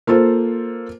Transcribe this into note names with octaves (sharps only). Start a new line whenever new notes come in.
A#3 F4 A4 C5